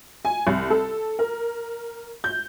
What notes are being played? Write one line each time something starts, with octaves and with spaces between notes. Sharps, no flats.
G#5
C2
A4
A#4
G6